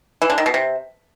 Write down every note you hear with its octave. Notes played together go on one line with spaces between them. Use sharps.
E3
D3
D#3
B2
C3